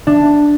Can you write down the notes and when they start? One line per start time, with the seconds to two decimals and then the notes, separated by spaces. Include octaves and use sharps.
0.07 D4